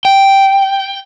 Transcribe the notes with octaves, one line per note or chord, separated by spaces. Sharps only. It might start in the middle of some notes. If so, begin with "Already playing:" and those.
G5